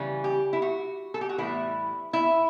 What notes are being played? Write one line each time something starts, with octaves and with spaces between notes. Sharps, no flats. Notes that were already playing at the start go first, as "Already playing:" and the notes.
Already playing: C#3 E3 G3 C#4
G4
E4
F#4
A4
G4
F#4
A2 E3 G3 B3 E4
E4